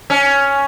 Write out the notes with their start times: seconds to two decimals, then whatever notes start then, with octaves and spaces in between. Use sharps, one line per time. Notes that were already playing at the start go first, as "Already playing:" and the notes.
0.10 C#4